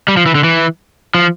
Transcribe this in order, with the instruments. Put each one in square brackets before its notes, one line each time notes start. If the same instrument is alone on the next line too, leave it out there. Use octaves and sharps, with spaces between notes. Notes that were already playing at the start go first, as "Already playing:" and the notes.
[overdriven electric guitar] G3
F3
E3
D3
E3
F3